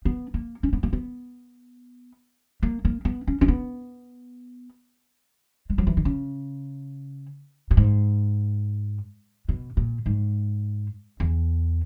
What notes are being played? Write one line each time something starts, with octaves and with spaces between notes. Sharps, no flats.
B3
A#3
C#4
B3
A#3
B3
A#3
A#3
B3
C#4
C#4
B3
G#3
F#3
E3
D#3
C#3
A#2
G#2
B2
A#2
G#2
E2